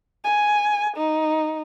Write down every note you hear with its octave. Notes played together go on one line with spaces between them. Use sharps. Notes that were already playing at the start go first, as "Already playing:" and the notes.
G#5
D#4